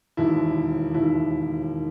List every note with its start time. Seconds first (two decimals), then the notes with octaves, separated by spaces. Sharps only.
0.17 E1 D#2 D#3 E4
0.94 E1 D#2 D#3 E4
1.73 D#3